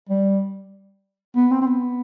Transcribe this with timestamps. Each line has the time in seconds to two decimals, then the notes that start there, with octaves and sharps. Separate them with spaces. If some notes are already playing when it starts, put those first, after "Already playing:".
0.09 G3
1.36 B3
1.51 C4
1.62 C4
1.67 B3